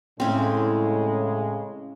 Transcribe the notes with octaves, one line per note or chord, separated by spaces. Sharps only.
A2 C#3 G#3 C4 C#4 E4